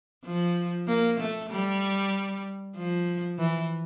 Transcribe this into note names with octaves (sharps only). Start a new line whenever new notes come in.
F3
A#3
A3
G3
F3
E3